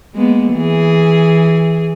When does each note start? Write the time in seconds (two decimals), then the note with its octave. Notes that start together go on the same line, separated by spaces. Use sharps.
0.15 G#3 A#3 B3
0.53 E3 G#4